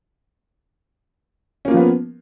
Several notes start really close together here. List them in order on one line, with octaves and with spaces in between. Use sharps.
C#4 A#3 F4 F3 B3